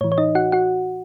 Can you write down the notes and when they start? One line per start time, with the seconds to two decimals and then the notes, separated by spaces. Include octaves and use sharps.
0.01 A2 C#5
0.04 E3
0.12 C#5
0.18 D#4 D#5
0.35 F#4 F#5
0.52 F#4 F#5